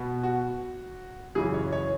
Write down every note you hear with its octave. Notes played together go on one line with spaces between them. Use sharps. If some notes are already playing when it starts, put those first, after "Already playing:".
Already playing: B2 B3
F#4
F#2 C#3 E3 G#4
C#5
C#5